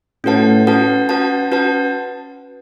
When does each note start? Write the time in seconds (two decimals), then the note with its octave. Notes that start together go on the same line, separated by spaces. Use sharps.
0.24 A2 C#4 F#4 B4 F#5 A5
0.67 C#4 F#4 B4 F#5 A5
1.09 C#4 F#4 B4 F#5 A5
1.51 C#4 F#4 B4 F#5 A5